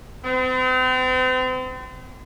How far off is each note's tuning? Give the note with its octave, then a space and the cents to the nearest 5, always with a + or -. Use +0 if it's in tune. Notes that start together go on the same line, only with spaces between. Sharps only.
C4 -40